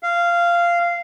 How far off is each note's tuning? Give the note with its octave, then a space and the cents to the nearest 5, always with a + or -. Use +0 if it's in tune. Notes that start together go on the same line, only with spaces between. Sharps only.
F5 -15